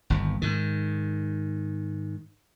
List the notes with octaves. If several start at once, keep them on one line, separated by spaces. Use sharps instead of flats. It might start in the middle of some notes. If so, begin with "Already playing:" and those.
G1 D#2
G#2 D#3